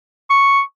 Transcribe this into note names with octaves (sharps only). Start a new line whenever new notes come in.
C#6